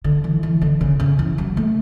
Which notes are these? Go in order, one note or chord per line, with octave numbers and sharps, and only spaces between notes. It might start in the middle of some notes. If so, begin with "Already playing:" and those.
D3
E3
E3
D3
C#3
C#3
E3
F#3
A3